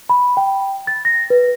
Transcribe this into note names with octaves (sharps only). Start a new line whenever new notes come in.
B5
G5
A6
A#6
B4